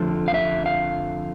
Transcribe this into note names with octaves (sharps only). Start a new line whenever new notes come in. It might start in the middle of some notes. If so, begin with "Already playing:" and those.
Already playing: F2 D3 F3 A3
F5
E5
F5